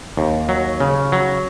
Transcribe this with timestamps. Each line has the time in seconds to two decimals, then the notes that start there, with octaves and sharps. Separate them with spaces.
0.17 D#2
0.49 F#3
0.80 C#3
1.12 F#3